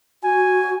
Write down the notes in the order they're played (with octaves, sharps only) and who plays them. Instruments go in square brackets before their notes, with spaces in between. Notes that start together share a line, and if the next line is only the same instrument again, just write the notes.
[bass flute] F#4 [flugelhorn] G#5